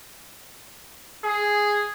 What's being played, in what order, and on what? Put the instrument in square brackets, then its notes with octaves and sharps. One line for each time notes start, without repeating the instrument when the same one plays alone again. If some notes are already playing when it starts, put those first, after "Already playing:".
[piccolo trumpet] G#4